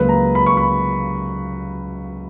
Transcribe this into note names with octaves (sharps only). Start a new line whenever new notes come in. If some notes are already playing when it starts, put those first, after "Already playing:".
Already playing: C#2 C#3 F#3 A#3 B4
A#5
B5
C#6
B5